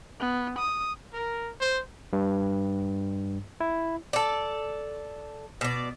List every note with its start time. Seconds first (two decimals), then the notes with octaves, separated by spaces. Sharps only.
0.20 B3
0.58 D#6
1.14 A#4
1.61 C5
2.13 G2
3.60 E4
4.13 A4 D5
5.61 B2 D5